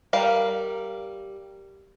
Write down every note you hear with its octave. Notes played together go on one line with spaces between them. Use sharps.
G3 A#4 F5